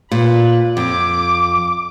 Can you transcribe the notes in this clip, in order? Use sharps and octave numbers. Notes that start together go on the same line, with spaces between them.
A#2 B4
F2 D6